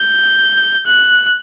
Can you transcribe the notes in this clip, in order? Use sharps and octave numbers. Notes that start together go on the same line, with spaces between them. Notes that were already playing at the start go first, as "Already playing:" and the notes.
Already playing: G6
F#6